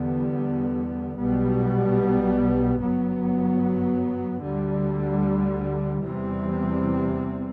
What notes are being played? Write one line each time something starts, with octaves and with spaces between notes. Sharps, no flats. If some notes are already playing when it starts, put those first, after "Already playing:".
Already playing: E2 D3 G3 B3
B1 B2 G3 B3
G1 F#2 F#3 B3
D2 D3 G3
E2 C3 E3 G3 C4